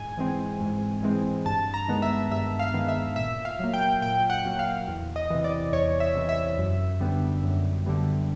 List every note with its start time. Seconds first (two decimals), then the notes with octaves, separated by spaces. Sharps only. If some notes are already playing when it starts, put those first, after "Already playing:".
Already playing: G#2 G#5
0.17 E3 G#3 C4
0.61 G#2
1.03 E3 G#3 C4
1.46 G2 A5
1.74 A#5
1.88 D#3 G#3 B3
2.02 E5
2.31 G2 E5
2.59 F5
2.74 D#3 G#3 B3
2.88 E5
3.16 A#2 E5
3.45 F5
3.59 F#3 A#3
3.73 G5
4.01 A#2 G5
4.30 F#5
4.45 F#3 A#3
4.59 F5
4.88 E2
5.16 D#5
5.30 C3 E3
5.44 D5
5.73 E2 C#5
6.00 E5
6.15 C3 E3
6.29 E5
6.58 F#2
7.00 D3 G3 B3
7.43 F#2
7.86 D3 G3 B3